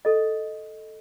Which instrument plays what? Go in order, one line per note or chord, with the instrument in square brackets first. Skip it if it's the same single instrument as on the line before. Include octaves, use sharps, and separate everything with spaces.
[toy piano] A4 D#5